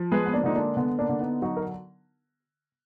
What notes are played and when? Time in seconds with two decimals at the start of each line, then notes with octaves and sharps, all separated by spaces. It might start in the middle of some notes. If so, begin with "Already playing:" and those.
Already playing: F3
0.12 G#3 G#4 B4
0.26 B3
0.33 A#3 D4
0.44 D3 D#4
0.55 A#3 D4
0.77 D3 B3
0.99 A#3 D4
1.09 D3
1.20 B3 D#4
1.42 F#3 D#4 F#4
1.57 A#4